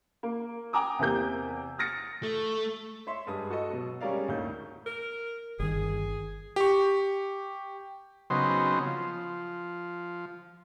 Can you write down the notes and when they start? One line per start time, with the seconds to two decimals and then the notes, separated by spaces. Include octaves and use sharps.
0.23 A#3
0.73 G5 G#5 A#5 D6 D#6
0.99 E2 C3 A#3 G6
1.78 D#6 F6 A6 A#6 C#7
2.23 A3
3.07 C#5 E5 C6
3.27 G2 G#3 D#6
3.50 F#4 A4 D#5
3.70 B2 F#3
4.01 G3 G#3 C#4 A#4 D5 F5
4.28 D2 A2 A#3 D#4 G6
4.86 A#4
5.59 G1 D#3 G#4
6.56 G4 C#6
8.30 C#3 F#3 B3 C4 D#4 C5
8.86 F3